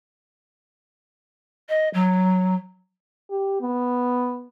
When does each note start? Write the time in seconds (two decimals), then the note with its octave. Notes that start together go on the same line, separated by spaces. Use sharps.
1.69 D#5
1.94 F#3
3.31 G4
3.61 B3